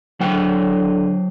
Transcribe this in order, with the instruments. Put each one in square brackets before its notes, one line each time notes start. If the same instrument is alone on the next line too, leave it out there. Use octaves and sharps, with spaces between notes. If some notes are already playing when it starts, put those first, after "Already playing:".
[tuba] D3 [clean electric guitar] F#3 C5 G5